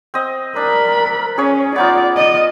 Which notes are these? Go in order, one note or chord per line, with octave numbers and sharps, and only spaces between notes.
C4 D#5
D4 A#4 B5
C#4 G#4 C#5
B3 D#4 F4 D5
D5 D#5